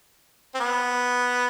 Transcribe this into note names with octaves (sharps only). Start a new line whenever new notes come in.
C4
B3